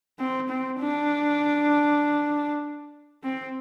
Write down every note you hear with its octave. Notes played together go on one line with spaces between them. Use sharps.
C4
C4
D4
C4